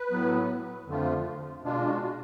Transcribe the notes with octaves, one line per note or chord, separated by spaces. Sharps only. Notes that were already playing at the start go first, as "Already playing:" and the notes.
Already playing: B4
A2 F#3 B3
F2 D3 F3 A3 F4
B2 G#3 D4 F4
F#4